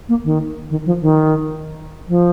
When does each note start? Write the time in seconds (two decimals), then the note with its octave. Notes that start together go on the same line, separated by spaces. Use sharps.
0.09 A#3
0.24 D#3
0.70 D#3
0.86 F3
1.01 D#3
2.08 F3